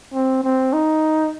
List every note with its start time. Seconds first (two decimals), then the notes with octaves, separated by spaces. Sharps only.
0.13 C4
0.44 C4
0.73 D#4